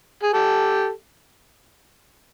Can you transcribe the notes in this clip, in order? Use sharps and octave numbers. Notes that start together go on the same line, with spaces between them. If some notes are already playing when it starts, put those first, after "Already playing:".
G#4
G4 A4